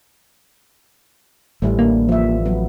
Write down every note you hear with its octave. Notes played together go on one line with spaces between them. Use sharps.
A1 E3 G3 A3
D3 A#3
F3 E5
F#3 B3